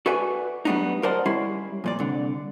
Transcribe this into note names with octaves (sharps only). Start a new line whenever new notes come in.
F#4 A4 B4 D5 E5 G#5
F#3 G3 A3 B3 D4 D#4
A#4 C5 D5 D#5 F#5 A5
G3 C#4 E4 C6
F2 A#2 D5
C2 D3